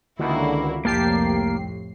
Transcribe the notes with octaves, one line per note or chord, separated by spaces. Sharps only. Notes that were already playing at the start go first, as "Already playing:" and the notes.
C#2 D3 D#3 A#3 E4 F#4
C2 F2 A2 A#3 G4 A#4 A5 C7